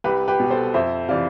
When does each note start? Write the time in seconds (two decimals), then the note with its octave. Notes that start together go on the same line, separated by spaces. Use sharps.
0.04 C2 G4 B4
0.28 G4 B4
0.40 B2
0.50 A4 C5
0.74 F2 C5 E5
1.08 C3 E3 D5 F5